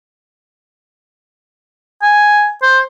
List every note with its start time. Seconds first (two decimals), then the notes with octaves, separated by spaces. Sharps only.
2.02 G#5
2.62 C5